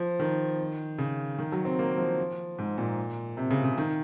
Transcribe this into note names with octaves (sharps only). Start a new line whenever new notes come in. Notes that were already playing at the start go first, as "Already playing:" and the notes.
Already playing: F3
D#3
C#3
D#3
F#3
C4
A#3
F3
G#2
A#2
C3
C#3
C#3
D#3